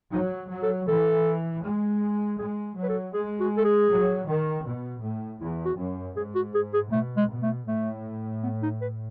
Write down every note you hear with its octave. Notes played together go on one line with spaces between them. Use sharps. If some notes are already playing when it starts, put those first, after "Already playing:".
F#3 D#4
F#3
A4
E3 A4
G#3
G#3 G#4
F#3
B4
A4
G#3 G#4
F#4
A4
G#4
F#3
D#3
B2
A2
E2 E4
F#4
F#2
G#2 G#4
F#4
G#4
G#4
B2 A3
G#3
B2
A3
A2 A3
B3
D#4
B4